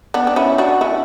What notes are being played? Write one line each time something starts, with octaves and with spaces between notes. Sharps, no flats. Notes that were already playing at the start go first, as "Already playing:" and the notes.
B3 D4
D4
C#4 E4
D4 F#4
C#4 E4